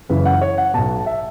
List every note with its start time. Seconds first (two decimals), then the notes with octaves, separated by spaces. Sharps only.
0.09 F#1 F#2 C#3 E3 B4
0.25 F#5
0.41 C#5
0.58 F#5
0.74 B1 B2 A5
1.06 E5